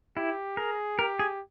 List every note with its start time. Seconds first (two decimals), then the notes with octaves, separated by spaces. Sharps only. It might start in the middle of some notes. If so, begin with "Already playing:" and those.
0.17 E4 G4
0.57 G#4 A#4
0.98 G4 A#4
1.19 G#4